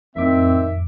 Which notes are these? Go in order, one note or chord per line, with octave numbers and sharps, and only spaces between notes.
F2 A2 D#3 C4 E5 D6